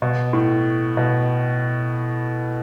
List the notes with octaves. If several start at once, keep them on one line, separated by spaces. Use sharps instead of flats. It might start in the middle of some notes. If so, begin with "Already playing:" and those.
B2
A2
B2